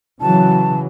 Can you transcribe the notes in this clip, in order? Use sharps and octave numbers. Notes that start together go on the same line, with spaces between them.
C#3 E3 F#3 A5